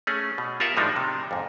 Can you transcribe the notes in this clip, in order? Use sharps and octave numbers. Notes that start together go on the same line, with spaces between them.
A3 C#4 G#4
B2
F4 G4 A#4 E5 F#5
A2 F3 G3 G#3 D4 D#4
C3
F2 G#2